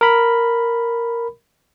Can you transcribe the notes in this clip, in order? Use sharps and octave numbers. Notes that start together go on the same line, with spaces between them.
A#4 B5